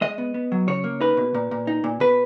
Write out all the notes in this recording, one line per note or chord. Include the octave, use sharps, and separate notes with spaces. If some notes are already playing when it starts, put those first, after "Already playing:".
G#3 D#5
B3
B3
F#3
C#3 C#5
A#3
D#4 B4
B2
A#2
A#2
D#4
A#2
B2 B4